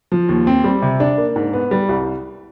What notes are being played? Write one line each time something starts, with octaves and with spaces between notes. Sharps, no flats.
F3
D#2
C4
G3
C3
D4
A#3
G#2
B3
G3
C2